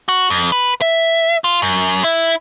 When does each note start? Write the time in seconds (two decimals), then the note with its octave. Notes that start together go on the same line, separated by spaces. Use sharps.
0.09 F#4
0.30 F2
0.52 B4
0.81 E5
1.44 F4
1.62 F#2
2.04 E4